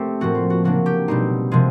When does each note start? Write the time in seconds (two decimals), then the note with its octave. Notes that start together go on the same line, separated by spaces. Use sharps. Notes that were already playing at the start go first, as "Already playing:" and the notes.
Already playing: A3 C4 G4
0.20 A2 F3 A#3 F#4
0.35 F4
0.50 F#4
0.64 C#3 F#3 A#3 D4 F#4
0.86 G4
1.08 B2 G3 C4 D#4
1.51 C3 F3 G#3